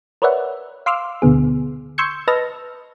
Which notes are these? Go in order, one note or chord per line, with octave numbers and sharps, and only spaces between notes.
A#4 B4 C#5 D5 E5 F#5
F5 C6 D6 E6 F6
D2 B2 D3 B3 G#4
C6 C#6 E6 G6 G#6 C#7
B4 D#5 A5 E6 F6 A#6